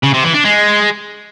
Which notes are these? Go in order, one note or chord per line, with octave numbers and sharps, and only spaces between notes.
C#3
C3
E3
D4
G#3